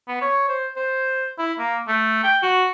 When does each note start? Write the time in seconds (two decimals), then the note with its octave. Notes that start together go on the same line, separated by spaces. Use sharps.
0.08 B3
0.22 C#5
0.49 C5
0.76 C5
1.38 E4
1.59 A#3
1.88 A3
2.24 G5
2.43 F#4